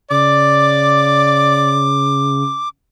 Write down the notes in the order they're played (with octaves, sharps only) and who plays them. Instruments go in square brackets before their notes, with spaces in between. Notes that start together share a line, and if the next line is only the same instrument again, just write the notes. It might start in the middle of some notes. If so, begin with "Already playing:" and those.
[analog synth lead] C#3 [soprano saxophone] D5 [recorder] D6